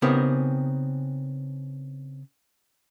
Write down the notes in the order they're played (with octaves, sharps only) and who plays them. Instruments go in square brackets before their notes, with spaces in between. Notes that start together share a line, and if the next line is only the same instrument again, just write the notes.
[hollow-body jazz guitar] C#3 B3 C4 D#4 G4 A#4